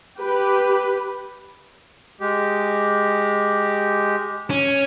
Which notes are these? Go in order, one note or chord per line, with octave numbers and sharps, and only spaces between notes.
G4 B4
G#3 G4
C#4